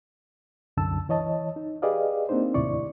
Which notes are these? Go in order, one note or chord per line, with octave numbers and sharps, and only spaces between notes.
C2 F#2 D3 A5 E6
E3 C#5 D#5 A5
D#4
G4 G#4 B4 D5 D#5 F5
A#3 C4 D4 D#4 C5
D#2 A2 C3 E4 D5 C#6